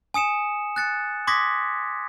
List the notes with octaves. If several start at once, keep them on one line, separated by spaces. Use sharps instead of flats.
G#5 D#6 C#7 E7
F#6 A6 C#7
C6 D6 D#6 G#6 A#6 B6